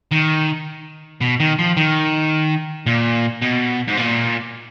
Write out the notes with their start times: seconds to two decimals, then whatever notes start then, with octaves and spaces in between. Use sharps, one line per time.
0.11 D#3
1.21 B2
1.40 D#3
1.59 F3
1.77 D#3
2.87 A#2
3.42 B2
3.88 G#2
3.98 A#2